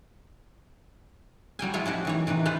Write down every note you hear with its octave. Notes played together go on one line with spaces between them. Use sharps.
F#3 G3 G5 G#5
F3 G#3 E4 F4 C#5
C#4 E4 F#4 G4
D#3 E3 C#5
C3 D#3 E3 B4
E3 F4 B4 C5